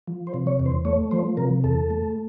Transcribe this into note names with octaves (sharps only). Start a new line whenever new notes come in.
F3
C5
C3
C#5
E2
C5
A3 C#5
F3 C5
C3 A#4
E2 A4
A3